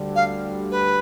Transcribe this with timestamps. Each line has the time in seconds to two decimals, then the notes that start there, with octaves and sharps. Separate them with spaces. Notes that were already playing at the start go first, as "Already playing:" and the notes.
Already playing: D2 D3 G3
0.16 F5
0.71 B4